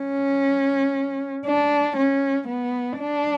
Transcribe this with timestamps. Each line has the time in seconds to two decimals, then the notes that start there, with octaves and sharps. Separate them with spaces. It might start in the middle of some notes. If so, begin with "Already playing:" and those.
Already playing: C#4
1.46 D4
1.96 C#4
2.47 B3
2.99 D4